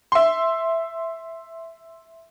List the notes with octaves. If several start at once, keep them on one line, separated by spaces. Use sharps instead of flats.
E5 C6